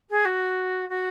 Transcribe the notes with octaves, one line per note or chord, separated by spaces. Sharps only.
G#4
F#4
F#4